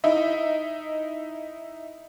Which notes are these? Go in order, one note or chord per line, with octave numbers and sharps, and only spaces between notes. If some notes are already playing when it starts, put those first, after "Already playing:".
D#4 E4 D#5 E5